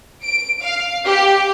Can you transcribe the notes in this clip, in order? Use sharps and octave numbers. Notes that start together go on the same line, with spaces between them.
D7
F5
G4